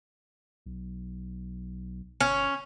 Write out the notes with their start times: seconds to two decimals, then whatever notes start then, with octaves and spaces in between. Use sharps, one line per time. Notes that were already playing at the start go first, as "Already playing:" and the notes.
0.66 B1
2.20 G1 C#4